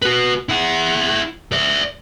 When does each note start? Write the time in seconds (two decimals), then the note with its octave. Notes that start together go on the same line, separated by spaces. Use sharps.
0.02 F#4 B4
0.49 E4 F#5
1.52 D5 E5